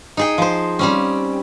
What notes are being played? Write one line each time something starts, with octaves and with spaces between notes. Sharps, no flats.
D#4 G#4 G5
F3 C5
G3 C4 C#4